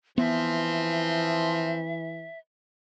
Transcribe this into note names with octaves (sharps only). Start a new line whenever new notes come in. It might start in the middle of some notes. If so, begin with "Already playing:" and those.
E3 F3 B3 C4 E5